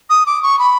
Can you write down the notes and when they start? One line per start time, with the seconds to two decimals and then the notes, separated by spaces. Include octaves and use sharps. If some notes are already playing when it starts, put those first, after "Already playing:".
0.10 D#6
0.26 D6
0.43 C#6
0.59 B5